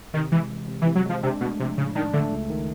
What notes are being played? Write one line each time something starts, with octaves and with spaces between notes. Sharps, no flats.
C3 D#3
E3 G#3
E3
C3
E3
C3
F#3
F3 G#3
C3 D4
B2 A3
C3 F3
A2 C#3
D#3 D4
D3 A3
C#2
D#3